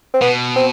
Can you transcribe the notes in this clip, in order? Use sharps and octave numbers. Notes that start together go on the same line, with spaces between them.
C4
B2 B3
C4